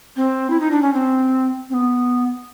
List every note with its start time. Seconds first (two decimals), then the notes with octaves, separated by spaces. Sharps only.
0.16 C4
0.50 E4
0.60 D#4
0.71 D4
0.82 C#4
0.94 C4
1.70 C4
1.74 B3